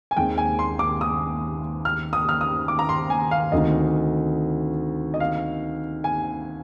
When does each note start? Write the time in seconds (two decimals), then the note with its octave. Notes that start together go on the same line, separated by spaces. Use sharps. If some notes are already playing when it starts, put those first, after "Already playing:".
0.11 G#5
0.17 D#2 D#3 G#3 C4 G5
0.38 G#5
0.59 C6
0.79 D6
1.01 D#6
1.85 F6
2.13 D#6
2.29 F6
2.41 D#6
2.68 D6
2.79 A#5
2.89 C6
3.10 G#5
3.31 F5
3.52 D2 C3 D#3 D#5
5.14 D#5
5.20 F5
6.04 G#5